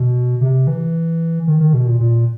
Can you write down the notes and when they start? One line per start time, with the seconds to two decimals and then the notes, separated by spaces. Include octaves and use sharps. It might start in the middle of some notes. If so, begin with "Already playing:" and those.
Already playing: B2
0.41 C3
0.67 E3
1.47 D#3
1.60 D#3
1.73 B2
1.87 A#2
2.00 A#2